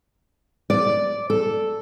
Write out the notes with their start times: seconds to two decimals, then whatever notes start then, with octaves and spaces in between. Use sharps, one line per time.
0.70 D5
1.30 A4